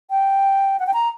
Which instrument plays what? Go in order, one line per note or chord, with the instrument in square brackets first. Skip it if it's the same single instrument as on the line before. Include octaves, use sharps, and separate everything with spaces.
[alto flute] G5
F#5
G5
A#5